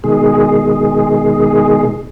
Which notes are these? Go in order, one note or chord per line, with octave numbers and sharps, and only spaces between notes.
B2 D#3 G#3 G#4